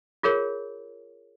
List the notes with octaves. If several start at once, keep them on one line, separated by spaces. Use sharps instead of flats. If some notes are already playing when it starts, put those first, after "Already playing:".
F4 G#4 A#4 C#5